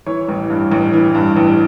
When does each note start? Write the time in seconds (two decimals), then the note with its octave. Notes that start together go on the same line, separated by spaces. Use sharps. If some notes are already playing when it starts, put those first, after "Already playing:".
0.06 E3 C#5
0.29 A1
0.50 G2
0.71 A1
0.93 E3
1.15 G2
1.36 A1